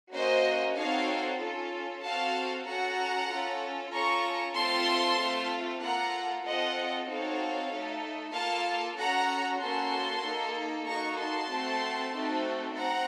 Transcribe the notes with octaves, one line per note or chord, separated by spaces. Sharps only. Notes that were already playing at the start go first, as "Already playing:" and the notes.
A#3 C#4 F#4 C5 D#5
C4 D#4 F#4 A4 C#5 F5
C#4 F4 A4
C4 F#4 A4 F5 A5
C#4 F#4 A4 F#5 A#5
C#4 F4 A4
C#4 F4 A4 A#5 C#6
A3 C4 F4 A4 A5 C6
A3 C4 F4 A4
A#3 F4 A4 F#5 A#5
C4 F4 A4 D#5 F#5
C4 D#4 F#4 A4 C#5 F5
A3 D#4 A4
A#3 F4 A4 F5 A5
C#4 F#4 A4 F#5 A#5
A#3 C#4 F#4 A4 A5 C6
A#3 D#4 A4
A#3 D#4 F#4 A4 A#5 C#6
A5 C6
A3 C4 F#4 A4
A3 C4 D#4 F#4 A4
C4 F#5 A#5